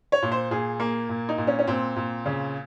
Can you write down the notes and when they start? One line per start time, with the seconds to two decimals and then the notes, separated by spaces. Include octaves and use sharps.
0.12 C#5
0.22 A#2
0.32 C5
0.51 A#2 G#4
0.80 A#3
1.09 A#2
1.29 D#4
1.38 A#2
1.47 C#4
1.59 C#4
1.67 A#2 C4
1.96 A#2
2.26 C#3